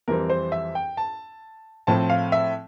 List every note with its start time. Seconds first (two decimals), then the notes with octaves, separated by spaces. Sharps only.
0.08 F2 E3 G3 C4 A#4
0.30 C5
0.52 E5
0.75 G5
0.97 A5
1.87 A2 F3 A3 C4 A5
2.10 F5
2.32 E5